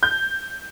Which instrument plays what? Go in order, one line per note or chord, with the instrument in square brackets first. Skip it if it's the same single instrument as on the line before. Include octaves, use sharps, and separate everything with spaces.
[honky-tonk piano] G6